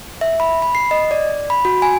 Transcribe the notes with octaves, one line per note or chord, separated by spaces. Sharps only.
E5
B5
B5
C7
D#5
D5
B5
F#4
G#5